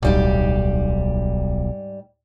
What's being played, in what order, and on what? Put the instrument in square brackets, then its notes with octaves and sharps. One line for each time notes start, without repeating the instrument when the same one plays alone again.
[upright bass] D1 [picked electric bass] B1 [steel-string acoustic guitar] G#2 G3 G4